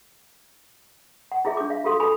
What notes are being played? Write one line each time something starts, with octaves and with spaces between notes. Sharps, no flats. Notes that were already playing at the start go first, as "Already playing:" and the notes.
F#5
E4 F4 G#4 E5
D4 G#4 D6
E5 F5
F4 F#4 G#4 A4 F5 C6
F4 A4 G#5 B5 D6